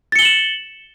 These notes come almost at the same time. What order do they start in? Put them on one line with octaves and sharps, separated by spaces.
A6 C#7 G7 F#7 E7